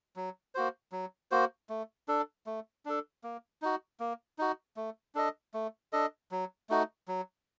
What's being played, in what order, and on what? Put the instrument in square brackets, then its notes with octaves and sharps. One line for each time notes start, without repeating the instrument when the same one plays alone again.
[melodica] F#3
A#3 F#4 C5
F#3
A#3 F#4 C5
A3
D4 A4
A3
D4 A4
A#3
D#4 F#4
A#3
D#4 F#4
A3
D4 A4 D#5
A3
D4 A4 D#5
F#3
A3 D#4 F#4
F#3